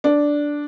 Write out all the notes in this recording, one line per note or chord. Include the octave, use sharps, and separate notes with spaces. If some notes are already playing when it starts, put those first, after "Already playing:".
D4